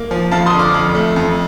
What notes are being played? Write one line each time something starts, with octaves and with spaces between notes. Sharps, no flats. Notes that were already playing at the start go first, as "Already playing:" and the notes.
Already playing: A#3
F3
F2 F5 A5
C6 D#6
D3
D6 F6
F2
A3
F2